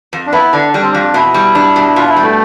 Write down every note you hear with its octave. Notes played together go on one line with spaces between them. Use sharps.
F2
D4
B3 E4
D3 D4
G3 D4
C4
F2 D4
B2 E4
G3
D4
B2
B2 F4
E4
G3
A3